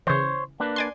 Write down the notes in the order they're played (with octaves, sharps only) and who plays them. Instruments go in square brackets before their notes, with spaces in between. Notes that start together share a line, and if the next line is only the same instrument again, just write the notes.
[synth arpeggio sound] C#3 E3 [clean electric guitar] C5 C#5
[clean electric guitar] A#3 D4 B4
[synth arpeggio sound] D5 G#5 C6